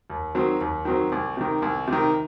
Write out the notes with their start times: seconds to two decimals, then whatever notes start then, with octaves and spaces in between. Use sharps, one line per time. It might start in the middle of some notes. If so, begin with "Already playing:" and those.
0.10 D#2
0.35 D#3 F#3 C4
0.61 D#2
0.85 D#3 F#3 C4
1.12 C2
1.37 C3 D#3
1.62 C2
1.87 C3
1.93 D#3